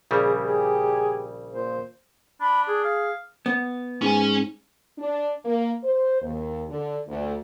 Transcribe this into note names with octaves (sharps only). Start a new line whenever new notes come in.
A#1 C#3 G3 G#4
G4 G#4
A#2 C5
D4 B5
G#4
F5
B3
G#2 C#4 G#5
D4
A#3
C5
D#2
D3
D2